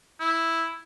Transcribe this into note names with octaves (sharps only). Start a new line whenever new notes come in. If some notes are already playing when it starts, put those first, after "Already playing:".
E4